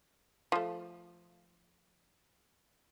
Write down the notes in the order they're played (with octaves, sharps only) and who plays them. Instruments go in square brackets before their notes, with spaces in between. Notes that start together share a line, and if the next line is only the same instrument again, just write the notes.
[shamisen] F3 A3